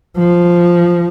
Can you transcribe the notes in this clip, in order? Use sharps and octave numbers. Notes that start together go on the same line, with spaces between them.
F3